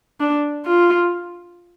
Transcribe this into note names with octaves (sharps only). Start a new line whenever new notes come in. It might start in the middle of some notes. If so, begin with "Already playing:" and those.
D4
F4